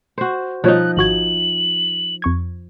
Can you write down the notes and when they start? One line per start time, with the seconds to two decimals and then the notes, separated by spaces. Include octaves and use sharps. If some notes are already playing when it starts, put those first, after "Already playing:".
0.18 F#4 C5
0.64 B2 F3 G3 D#4 C#5 F#6
0.97 G#1 F#4 G#6 F#7
2.22 F2 C#6 G#6